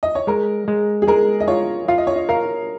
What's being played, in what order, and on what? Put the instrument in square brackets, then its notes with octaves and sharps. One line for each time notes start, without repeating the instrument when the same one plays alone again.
[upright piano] D#5
C#5
[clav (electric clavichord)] G#3 [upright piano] A#4
[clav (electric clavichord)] G#3
[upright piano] G#4
[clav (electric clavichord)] G#3 [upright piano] A#4
[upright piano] D#5
[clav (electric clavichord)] F4 [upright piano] C#5
[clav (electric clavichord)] F4 [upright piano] F5
[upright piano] D#5
C#5
D#5
[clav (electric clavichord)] A#4 [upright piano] F5